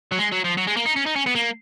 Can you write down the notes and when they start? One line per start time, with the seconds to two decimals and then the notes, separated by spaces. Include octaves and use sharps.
0.12 F#3
0.18 G#3
0.32 F#3
0.44 F3
0.57 F#3
0.67 G#3
0.77 A#3
0.86 D#4
0.96 C#4
1.06 D#4
1.16 C#4
1.26 B3
1.35 A#3